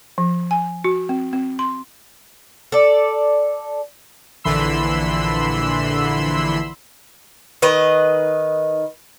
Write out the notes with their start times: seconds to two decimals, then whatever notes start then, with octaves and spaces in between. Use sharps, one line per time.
0.18 F3
0.51 G#5
0.84 F#4
1.09 C4
1.33 C4
1.59 C6
2.72 A4 D5
4.44 A#1 D3 E3 B5 C6 E6
7.62 D#3 B4 D#5